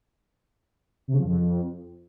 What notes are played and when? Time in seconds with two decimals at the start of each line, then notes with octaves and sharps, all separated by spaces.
1.08 C3
1.13 C#3
1.19 F3
1.24 F2